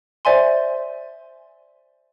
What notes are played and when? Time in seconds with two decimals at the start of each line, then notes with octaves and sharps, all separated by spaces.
0.25 C5 D5 E5 G#5 C6